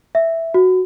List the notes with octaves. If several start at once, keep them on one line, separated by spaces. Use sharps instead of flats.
E5
F#4